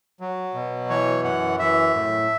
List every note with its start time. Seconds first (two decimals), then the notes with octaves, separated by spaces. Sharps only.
0.20 F#3
0.54 B2
0.90 E3 C#5
1.24 F#2 F#5
1.59 E3 E5
1.94 A2